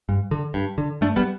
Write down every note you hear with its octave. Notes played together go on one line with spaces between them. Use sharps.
G2
D3
G2
D3
G2 A3 D4
G3 B3